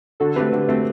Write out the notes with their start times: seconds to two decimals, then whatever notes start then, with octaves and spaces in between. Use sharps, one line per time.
0.20 D3 F#4 A4
0.36 A3 C4 G4 B4
0.52 D3
0.68 A3 C4